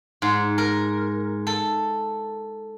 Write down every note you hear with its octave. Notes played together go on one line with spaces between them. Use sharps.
G#2
A#4
A4